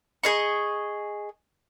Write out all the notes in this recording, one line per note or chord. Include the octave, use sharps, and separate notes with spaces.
G#4 D#5 C#6